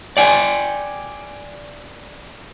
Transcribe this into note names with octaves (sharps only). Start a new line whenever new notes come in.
D5 G5 G#5